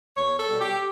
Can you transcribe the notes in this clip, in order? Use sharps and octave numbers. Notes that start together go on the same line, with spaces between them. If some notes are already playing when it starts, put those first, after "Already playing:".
E2 C#5
A4
B2 G3
G4